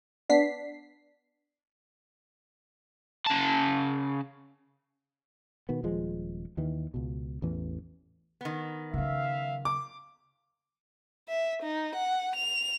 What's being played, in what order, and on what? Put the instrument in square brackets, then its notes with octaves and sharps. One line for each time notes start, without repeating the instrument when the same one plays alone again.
[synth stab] B3 D4 B6 C7
[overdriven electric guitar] C#3 A5
[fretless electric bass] B2 D#3 B3
D#1 F3 G#3
D#2 D#3 E3
C#2 B2
A1 E2 E3
[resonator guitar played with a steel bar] D#3 B3
[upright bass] C#3 F#3 [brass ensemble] E5 F5
[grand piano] D6
[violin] E5
D#4
F#5
F7